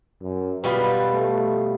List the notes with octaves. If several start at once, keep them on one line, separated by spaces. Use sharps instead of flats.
F#2
B2 G3 F4 B4
A3